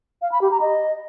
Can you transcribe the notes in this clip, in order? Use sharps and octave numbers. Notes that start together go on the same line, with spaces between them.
F5
B5
G4
A#5
D#5